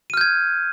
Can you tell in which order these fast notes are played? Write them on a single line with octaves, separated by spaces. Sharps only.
D#7 F6 G6 G#6